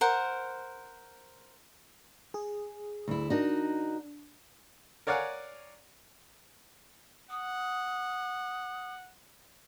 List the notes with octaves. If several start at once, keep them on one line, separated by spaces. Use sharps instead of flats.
A#4 C5 F#5
G#4
D2 E4
D4 D#4 F#4 A#4
A#4 C#5 D5 F5 F#5 G#5
F#5 D#6